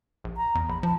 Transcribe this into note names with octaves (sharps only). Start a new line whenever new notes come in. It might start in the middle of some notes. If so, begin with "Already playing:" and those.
A#1
A#5
E2
A#1 B5
F3 A5